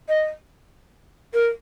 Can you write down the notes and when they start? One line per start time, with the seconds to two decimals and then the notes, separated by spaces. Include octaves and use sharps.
0.09 D#5
1.34 A#4